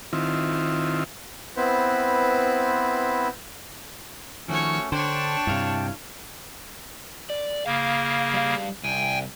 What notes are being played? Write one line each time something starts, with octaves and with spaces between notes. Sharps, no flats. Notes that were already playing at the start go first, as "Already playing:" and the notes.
D#3 C4 E4 F4
B3 C4 E4 B4 C5
D#3 F3 A3 C#4 F#4 C#5
D3 D4 C5 C#5 G5 A5
G2 C3 E4 F5
D5
C#3 A#3 F5
G3 F5
C2 G5 G#5